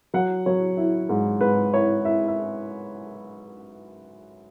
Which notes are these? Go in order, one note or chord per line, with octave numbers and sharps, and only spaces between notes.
F#3 F#5
F#3 C#5
E4
G#2
G#2 B4
E4 C#5
E4 E5
E5